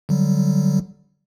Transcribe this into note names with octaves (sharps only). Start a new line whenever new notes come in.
D3 F#3 G3